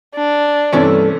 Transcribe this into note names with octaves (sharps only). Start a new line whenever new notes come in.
D4
G2 C3 E3 A3 C#4 D5